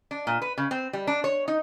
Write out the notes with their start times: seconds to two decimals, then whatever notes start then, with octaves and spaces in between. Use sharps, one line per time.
0.11 D4
0.27 A#2
0.42 B4
0.58 C#3
0.71 C4
0.93 G3
1.07 D4
1.24 C#5
1.48 D#4